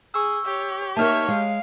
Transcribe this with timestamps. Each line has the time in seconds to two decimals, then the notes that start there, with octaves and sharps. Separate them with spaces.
0.14 G#4 C#6 E6
0.45 G4 C#5
0.97 A#3 D#4 A#4 C#5 E5 A5 F6
1.28 G#3 C#5 F5